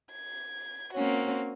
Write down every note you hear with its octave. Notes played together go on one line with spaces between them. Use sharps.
G#6
A#3 C4 C#4 F#4